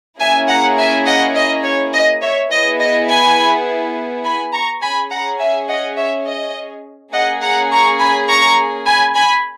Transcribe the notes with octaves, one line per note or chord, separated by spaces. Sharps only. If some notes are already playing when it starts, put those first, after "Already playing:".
A#3 C#4 E4 G#4 E5 G#5
F#5 A#5
E5 G#5
D#5 F#5
D#5
C#5
D#5
C#5 E5
B3 E4 G#4 D#5
D#5
G#5 B5
G#5 B5
A#5 C#6
C#4 G#4 G#5 B5
F#5 A#5
E5 G#5
D#5 F#5
C#5 E5
D#5
A#3 C#4 G#4 D#5 F#5
F#5 A#5
A#5 C#6
G#5 B5
A#5 C#6
G#5 B5
G#5 B5